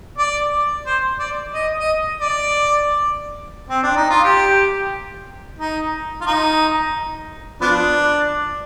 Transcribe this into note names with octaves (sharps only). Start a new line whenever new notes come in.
D5
C5
D5
D#5
D#5
D5
C4
D4
D#4
F4
G4
D#4
F4
D#4
F3 B3 D4